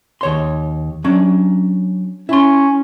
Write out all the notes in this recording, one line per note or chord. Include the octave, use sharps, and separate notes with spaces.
D#2 C#5 C6
F#3 C#4 D4
C#4 E4 C6